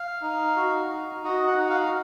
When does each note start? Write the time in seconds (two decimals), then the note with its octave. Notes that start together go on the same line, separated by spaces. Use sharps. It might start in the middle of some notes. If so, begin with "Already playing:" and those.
Already playing: F5
0.22 D#4
0.56 F#4
0.90 D#4
1.24 F#4 D#5
1.47 F#5
1.58 D#4 F#5
1.70 F5